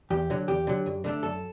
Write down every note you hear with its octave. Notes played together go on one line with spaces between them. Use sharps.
E2 G4
D3 F#3
E2 G4
D3 F#3
F#2
D3 A3 D4
F#2 A4